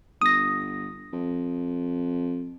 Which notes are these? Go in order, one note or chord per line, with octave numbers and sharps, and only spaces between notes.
G1 D#6 A#6
F2